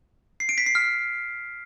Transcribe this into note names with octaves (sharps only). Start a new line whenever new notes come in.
C7
D7
B6
C7
F6